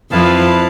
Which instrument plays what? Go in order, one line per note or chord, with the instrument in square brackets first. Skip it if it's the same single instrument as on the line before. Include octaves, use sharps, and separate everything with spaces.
[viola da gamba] F2 F3 [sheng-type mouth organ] E4 B4 F5 A5